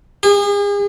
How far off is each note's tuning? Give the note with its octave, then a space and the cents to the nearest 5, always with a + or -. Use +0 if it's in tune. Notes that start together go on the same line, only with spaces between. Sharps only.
G#4 -40